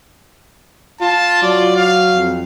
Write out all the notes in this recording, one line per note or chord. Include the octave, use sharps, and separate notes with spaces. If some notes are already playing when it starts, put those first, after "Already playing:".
F4 A5
F#3 D5
F5
F2